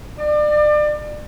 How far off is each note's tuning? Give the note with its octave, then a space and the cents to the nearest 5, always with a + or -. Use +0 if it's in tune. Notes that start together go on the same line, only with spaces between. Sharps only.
D5 +30